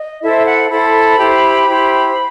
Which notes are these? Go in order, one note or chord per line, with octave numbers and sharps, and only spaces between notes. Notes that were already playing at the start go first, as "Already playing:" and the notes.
Already playing: D#5
E4 A4 C5 E5
F#5
E4 A4 C5 B5
E4 G4 C5
E4 G4 C5